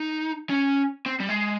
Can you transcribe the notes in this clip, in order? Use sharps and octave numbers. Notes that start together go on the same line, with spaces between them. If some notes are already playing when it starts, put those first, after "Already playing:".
Already playing: D#4
C#4
C4
G3
G#3